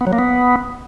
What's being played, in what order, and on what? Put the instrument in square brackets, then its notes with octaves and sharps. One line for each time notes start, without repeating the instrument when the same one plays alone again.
[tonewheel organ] B3
F#3
A#3
B3